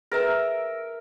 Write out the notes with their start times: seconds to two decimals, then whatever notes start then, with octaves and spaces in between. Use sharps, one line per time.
0.12 G#4 A#4 B4 E5 A#5